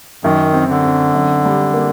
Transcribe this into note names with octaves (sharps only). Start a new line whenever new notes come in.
F#2 D#3
C4
D3
C4
F#2
G3
A#3